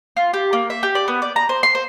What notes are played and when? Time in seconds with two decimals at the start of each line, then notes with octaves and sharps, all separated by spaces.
0.17 F4
0.33 G4
0.53 A#3
0.70 E5
0.83 G4
0.95 D5
1.08 B3
1.22 D5
1.36 A#5
1.49 C5
1.63 C6
1.75 C5